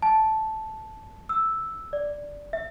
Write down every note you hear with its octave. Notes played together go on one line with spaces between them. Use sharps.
A5
E6
D5
E5